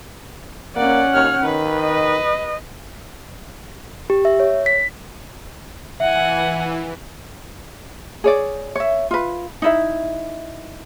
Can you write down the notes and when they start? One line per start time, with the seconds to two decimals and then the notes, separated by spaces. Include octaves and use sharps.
0.76 A#3 C#4 D5 F#5
1.13 D#2 C#5 F6
1.43 D#3 B4
1.80 D#5
4.10 G4
4.25 E5
4.40 C#5
4.66 B6
6.00 E3 E5 F#5 G#5
8.24 G#4 C#5 D5
8.75 C#5 E5
9.11 F4 B4
9.62 D#4 E4 E5